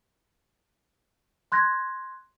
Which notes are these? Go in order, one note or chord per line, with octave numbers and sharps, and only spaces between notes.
C6 F#6 G#6 A#6